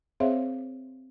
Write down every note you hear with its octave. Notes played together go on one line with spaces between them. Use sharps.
C4 G#4 C5 C#5 E5 F5